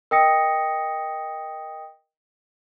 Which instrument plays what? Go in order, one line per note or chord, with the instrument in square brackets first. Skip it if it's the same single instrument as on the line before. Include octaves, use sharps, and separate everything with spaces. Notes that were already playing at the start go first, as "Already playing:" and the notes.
[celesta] A#4 D#5 G5 D#6 A#6 C#7